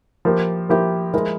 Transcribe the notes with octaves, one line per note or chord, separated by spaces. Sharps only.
F3 A#3 E4 G4 A#4
F3 A#3 E4 G4 A#4
F3 G#3 E4 A#4